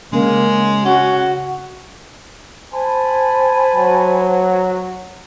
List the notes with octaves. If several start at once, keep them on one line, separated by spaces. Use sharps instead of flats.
C#3 G#3 A#3
C#4 F#4 F#5
C5 G#5 A5 B5
F#3